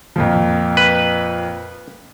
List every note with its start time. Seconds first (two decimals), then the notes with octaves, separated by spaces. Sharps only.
0.16 F2 A#2 F3
0.77 B4